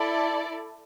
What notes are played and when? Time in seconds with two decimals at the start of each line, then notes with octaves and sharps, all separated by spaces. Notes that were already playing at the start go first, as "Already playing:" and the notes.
Already playing: E4 A4 D5